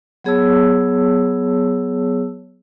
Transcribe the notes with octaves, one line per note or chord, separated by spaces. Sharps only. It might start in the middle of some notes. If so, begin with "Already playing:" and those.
F#3 B3 G#4 C#5 A5 E6